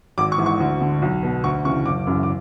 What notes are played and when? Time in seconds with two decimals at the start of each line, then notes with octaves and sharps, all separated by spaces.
0.18 G#1 D6
0.32 C#6
0.38 G#2 E3
0.46 C#6
0.60 D2
0.81 D3
1.02 B1
1.23 B2
1.44 D2 C#6
1.65 C#3 E3 C#6
1.85 F#1 D6
2.07 F#2 C#3 E3
2.23 D6